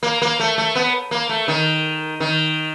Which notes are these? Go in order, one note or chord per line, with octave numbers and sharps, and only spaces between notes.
A#3
A#3
A3
A3
B3
A#3
A3
D#3
D#3